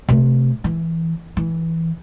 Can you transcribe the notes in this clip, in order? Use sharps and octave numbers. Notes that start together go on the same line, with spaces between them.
C3 A3
E3
E3